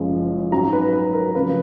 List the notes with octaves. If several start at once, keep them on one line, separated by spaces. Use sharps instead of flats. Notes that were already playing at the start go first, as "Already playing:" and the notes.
Already playing: F#1 F#2 F3 G#3
G#2 F#3 C#4 A#5
B4
B4
A#4
C#3 F3 A#3 B4